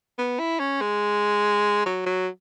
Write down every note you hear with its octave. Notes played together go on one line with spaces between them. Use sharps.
B3
E4
C#4
G#3
F#3
F#3